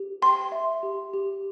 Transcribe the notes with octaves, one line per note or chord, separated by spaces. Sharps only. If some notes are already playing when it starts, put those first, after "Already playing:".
Already playing: G4
G5 C6
E5
G4
G4